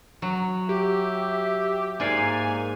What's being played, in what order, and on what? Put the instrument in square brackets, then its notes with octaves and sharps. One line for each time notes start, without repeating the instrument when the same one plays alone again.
[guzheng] F#3
[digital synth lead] G4 [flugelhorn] E5
[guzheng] G#2 D5 F5 [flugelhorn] A#3 [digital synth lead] G#5